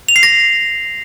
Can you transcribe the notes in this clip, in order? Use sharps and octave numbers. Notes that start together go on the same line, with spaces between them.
F7
C7
A#6